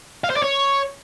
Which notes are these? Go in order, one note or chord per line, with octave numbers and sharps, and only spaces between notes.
F5
C5
D5
C#5